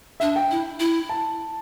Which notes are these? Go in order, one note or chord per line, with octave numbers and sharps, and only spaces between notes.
D4 E5
G5
E4
E4
A5